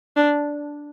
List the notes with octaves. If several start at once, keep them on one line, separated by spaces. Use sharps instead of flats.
D4